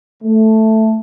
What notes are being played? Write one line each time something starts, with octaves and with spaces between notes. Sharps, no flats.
A3